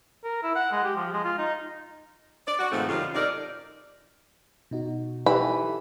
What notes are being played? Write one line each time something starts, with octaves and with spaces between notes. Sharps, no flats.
A#4
E4
F#5
G#3
G4
F3
G#3
F4
D#4
D5
F#4
G#2 B2 D#3 F3 A3 C4
F#2 C3 D#3 G3 F4
C3 D#4 A4 A#4 D5
B2 D#4 F#4
E3 D#4 G4 A4 B5